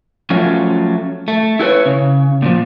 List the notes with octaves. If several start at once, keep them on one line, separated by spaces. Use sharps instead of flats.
F3 F#3 A3 C#4 F4
A3
E4 F#4 A4 B4 C#5
C#3
A#2 F3